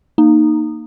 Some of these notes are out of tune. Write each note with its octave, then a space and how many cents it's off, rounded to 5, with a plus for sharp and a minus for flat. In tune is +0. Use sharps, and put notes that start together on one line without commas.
A#3 +0 D#4 -15